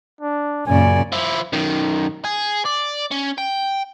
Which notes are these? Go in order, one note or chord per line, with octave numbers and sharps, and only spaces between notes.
D4
F#2 A#2 C#3 D5 G#5
F3 E4
F#2 D#3
G#4
D5
C#4
G5